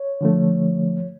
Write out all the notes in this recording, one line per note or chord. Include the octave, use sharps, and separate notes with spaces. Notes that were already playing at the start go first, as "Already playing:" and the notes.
Already playing: C#5
D3 F3 A3